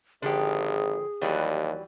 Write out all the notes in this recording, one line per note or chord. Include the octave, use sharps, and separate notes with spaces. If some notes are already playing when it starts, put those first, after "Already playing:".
G#1 D3 F3 G4 G#4
D#2 E3 F#3 G3